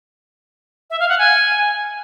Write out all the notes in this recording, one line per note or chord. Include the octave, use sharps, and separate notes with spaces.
E5
F5
F#5
G#5